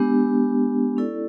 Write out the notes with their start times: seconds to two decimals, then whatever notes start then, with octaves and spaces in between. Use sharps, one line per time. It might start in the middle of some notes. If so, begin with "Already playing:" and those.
Already playing: G#3 B3 D4 G4
0.97 C#4 E4 A4 D5